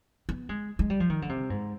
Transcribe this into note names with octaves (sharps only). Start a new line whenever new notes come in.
B3
G#3
G#3
G3
F3
D#3
D3
C3
G#2